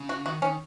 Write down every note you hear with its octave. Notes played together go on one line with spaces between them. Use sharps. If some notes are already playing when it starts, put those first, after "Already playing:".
Already playing: C#3
F#4
D#3 F#4
D#3 C#4